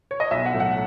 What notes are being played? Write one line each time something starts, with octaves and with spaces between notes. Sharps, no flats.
C#5
D#5
B1 E5
F#5
A2 F#3 A3
F#5